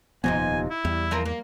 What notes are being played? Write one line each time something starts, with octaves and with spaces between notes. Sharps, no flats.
D#1 F2 C3 F3 B3 D#4 G#5
E4
E2 G3
F3 C4 A#4
A#3